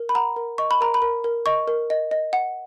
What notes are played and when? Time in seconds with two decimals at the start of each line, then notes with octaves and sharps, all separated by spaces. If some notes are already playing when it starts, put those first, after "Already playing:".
Already playing: A#4
0.09 B5
0.15 F#5 A#5
0.36 A#4
0.58 D#5 C#6
0.71 B5
0.81 A#4 A#5
0.94 B5
1.02 A#4
1.24 A#4
1.46 D#5 C#6
1.68 A#4
1.90 D#5
2.11 D#5
2.33 F#5